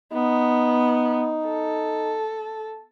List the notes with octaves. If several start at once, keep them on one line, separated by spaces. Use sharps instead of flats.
B3 D#4
A4